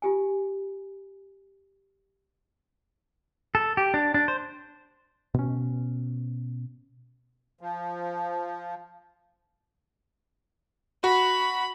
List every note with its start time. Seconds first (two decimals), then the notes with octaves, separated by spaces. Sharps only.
0.02 F4 G4 G#5
3.55 A4
3.77 G4
3.94 D4
4.14 D4
4.28 C5
5.34 B2 C#4
7.61 F3
11.04 F#4 B5